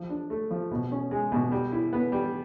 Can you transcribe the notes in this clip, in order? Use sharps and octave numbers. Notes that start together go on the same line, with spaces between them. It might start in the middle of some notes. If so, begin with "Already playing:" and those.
Already playing: F3
D4
A3
F3
B2
C#4
G#3
B2
G3
E4
B3
G3